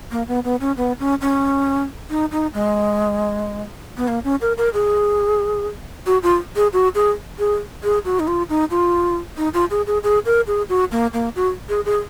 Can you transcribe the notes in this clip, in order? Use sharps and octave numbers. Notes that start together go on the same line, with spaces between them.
A#3
B3
B3
C#4
B3
C#4
C#4
D#4
D#4
G#3
B3
A#3
C#4
A#4
A#4
G#4
F#4
F4
G#4
F#4
G#4
G#4
G#4
F#4
D#4
F4
D#4
F4
D#4
F4
G#4
G#4
G#4
A#4
G#4
F#4
A#3
A#3
F#4
G#4
G#4